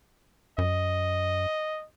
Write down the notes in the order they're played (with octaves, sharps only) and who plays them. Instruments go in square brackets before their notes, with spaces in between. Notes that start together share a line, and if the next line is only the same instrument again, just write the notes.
[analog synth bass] F#2 [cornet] D#5